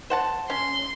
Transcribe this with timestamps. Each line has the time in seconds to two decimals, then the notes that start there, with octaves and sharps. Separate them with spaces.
0.10 C5 F#5 A5
0.50 C#4 C6